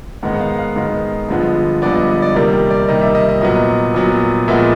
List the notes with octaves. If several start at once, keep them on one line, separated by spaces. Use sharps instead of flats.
G#2 D#3 G#3 B3 F#5
F#5
F5
F#5
F5
G#2 D#3 G#3 B3
G2 D3 F3 G#3 B3
G2 D3 F3 G#3 B3 D5
D#5
D#5
D5
C3 D#3 G3 A#3 D5
D5
C3 D#3 G3 A#3 D#5
E5
D#5
D#5
A#2 F#3 B3 D#5
A#2 F#3 B3
A#2 F3 G#3 B3 E5